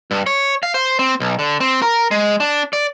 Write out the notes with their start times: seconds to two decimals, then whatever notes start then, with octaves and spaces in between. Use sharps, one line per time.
0.11 G2
0.26 C#5
0.63 F5
0.74 C5
0.99 C4
1.20 B1
1.39 D3
1.60 C4
1.82 A#4
2.11 G#3
2.40 D4
2.73 D5